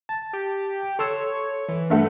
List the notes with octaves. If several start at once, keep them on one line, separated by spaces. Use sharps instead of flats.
A5
G4
A4 C#5 C6 E6
E3
G2 A3 F#5